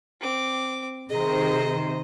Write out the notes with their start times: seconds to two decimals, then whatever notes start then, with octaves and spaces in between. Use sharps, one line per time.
0.20 C4 D6
1.10 C3 D#3 G#4 C5 D#5 A#5